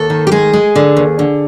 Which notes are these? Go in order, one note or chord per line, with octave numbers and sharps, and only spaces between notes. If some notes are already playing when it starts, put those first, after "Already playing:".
Already playing: D#2 A4
D#3
G4
G#3 G#4
G#3
D3
D#2
D3